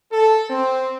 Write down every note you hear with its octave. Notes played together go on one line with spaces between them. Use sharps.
A4
C4